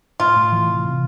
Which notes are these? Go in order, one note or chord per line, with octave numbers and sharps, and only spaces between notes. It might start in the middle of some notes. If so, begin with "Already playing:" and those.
A2 F4
A2
E3
C3
C3